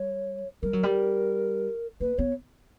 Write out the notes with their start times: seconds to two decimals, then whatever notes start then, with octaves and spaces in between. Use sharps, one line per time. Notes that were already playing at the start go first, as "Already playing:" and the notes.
Already playing: G3 C#5
0.62 G3 A#4
0.73 F#3
0.83 G3
2.00 A#3 B4
2.18 B3 C#5